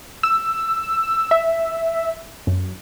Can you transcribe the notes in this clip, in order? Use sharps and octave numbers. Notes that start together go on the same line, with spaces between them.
E6
E5
F#2